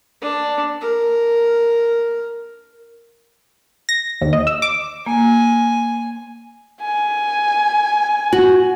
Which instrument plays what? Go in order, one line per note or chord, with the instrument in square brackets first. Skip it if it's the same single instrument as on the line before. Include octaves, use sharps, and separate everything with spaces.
[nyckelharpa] D4
A#4
[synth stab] A#6
D#2
D#5
E6
D6
[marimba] A#3 [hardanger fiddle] G#5
[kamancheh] G#5
[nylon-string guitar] F#4